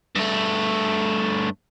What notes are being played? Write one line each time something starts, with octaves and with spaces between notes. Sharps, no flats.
G2 A3